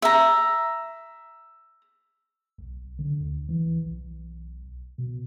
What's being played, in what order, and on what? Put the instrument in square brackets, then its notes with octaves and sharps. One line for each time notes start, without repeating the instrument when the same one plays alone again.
[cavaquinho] E5 A#5
[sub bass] B1
D3
D2
E3
B1
B2